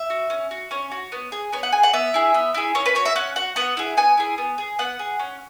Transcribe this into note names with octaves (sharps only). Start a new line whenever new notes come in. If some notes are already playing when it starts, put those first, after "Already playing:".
Already playing: E5
F#4
C#4
F#4
C#4 C#5
F#4
B3
G#4
B3 C#5
F#5
G#4 G#5
F#5
B3 E5
E4 G#4
B3
E4 G#4
C#4 C#5
B4
F#4 C#5
E5
C#4 F#5
F#4 F#5
B3 F#5
E4 G#4
B3 G#5
E4 G#4
B3
G#4
B3 F#5
G#4
C#4